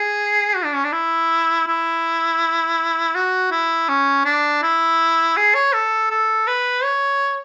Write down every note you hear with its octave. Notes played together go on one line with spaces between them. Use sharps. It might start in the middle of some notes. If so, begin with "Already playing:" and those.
Already playing: G#4
F#4
D4
C#4
D4
E4
E4
F#4
E4
C#4
D4
E4
G#4
C#5
A4
A4
B4
C#5